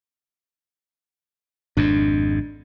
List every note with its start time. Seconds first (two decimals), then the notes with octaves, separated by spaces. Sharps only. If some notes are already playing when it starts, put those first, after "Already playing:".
1.77 G#1 F2 G#2 D4